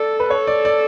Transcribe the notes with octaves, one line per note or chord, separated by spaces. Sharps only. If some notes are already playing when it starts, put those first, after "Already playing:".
Already playing: A4 D5
B4
A4 C#5
D5
D5